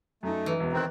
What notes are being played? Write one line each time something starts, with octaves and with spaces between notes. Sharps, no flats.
F#2 A3 D#4
E3
E1 B3
D#3 C4 A#5 F#6